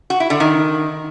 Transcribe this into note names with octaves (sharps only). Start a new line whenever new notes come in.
F#4
E4
D3
D#3